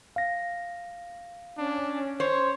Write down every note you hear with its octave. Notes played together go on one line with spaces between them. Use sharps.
F5 A#6
C#4 D4
C5 C#5